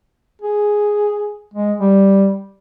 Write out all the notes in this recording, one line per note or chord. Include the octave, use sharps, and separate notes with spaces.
G#4
G#3
G3